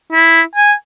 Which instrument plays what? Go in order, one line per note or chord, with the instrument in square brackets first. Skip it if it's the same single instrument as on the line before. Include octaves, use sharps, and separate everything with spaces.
[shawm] E4
G#5